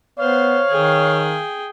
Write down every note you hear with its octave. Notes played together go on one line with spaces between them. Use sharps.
B3 C5 C#5 F5
D#3 G#4 G5